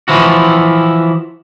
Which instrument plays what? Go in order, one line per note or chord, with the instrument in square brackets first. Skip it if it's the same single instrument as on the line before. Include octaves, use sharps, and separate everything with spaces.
[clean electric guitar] E3 F3 E4 F#4